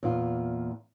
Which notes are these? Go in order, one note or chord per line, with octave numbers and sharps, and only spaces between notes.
E2 A#2 F4